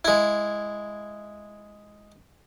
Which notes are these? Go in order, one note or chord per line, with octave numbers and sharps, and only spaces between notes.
G#3 E4